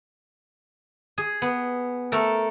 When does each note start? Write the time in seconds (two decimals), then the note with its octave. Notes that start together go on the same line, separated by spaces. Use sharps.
1.18 G#4
1.42 B3
2.12 A3 A4 A#4